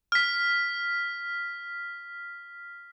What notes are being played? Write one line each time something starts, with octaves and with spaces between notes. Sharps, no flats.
F6 B6